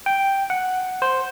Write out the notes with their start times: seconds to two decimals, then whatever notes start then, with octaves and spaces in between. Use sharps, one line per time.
0.06 G5
0.50 F#5
1.02 C5